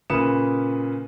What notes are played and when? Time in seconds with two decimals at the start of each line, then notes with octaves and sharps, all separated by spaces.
0.10 A#2 C#3 B4 D#6 C#7 E7